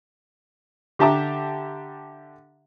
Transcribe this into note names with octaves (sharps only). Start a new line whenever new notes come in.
D3 G4 E5 A5 A#5 D6